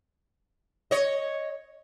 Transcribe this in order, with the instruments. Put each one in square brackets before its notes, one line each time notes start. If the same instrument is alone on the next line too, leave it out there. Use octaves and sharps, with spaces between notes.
[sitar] C#5 D#5